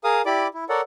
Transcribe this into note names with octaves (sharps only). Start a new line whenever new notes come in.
G#4 A#4 F5 D#6
E4 G4 D5 B5 D6
E4
A4 A#4 C#5 D5 F#5